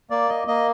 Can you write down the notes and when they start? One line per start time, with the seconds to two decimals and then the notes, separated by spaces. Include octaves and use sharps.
0.10 A#3 D5
0.29 D#5
0.48 A#3 D#5